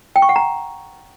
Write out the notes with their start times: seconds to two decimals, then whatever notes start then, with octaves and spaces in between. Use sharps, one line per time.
0.16 G5
0.22 C#6
0.29 F#5
0.36 A#5